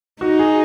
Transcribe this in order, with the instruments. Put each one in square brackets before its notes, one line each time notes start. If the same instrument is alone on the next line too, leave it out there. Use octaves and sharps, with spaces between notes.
[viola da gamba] D#4 [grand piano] F#4
[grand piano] G#4